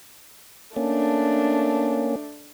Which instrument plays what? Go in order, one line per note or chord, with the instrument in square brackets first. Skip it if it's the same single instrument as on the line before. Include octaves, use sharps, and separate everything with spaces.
[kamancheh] A3 D4 [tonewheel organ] A#3 C#4